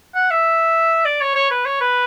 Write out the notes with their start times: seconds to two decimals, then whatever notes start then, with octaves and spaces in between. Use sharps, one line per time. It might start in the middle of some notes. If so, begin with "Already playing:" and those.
0.15 F#5
0.30 E5
1.05 D5
1.21 C#5
1.35 C#5
1.51 B4
1.65 C#5
1.81 B4